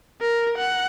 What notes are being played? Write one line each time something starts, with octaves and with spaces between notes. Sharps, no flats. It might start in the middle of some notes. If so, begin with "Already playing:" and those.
A#4
F#5